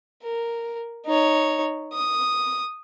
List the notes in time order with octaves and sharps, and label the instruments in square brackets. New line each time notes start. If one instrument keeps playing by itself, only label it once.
[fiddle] A#4
D#4 C#5
D#6